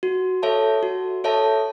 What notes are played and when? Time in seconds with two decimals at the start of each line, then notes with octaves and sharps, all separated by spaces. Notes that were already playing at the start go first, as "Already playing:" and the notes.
0.03 F#4
0.42 A4 C#5 E5 A5
0.83 F#4
1.24 A4 C#5 E5 A5